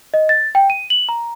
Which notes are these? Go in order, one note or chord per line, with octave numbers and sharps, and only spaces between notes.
D#5
A6
G5
D#7
F#7
A#5